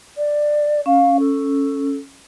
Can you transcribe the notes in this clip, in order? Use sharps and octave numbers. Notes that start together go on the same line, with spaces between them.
D5
C#4 F5
A4